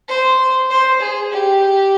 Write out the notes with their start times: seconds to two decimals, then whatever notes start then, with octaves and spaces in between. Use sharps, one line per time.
0.08 C5
0.70 C5
1.01 G#4
1.32 G4